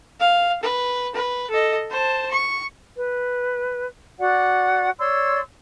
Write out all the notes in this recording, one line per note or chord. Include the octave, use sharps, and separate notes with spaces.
F5
B4
B4
A4 D#5
C5 A5
C#6
B4
F#4 D5 F#5
C#5 D5 C6 E6